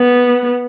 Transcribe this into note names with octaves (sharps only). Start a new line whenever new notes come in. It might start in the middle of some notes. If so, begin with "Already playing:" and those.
Already playing: B3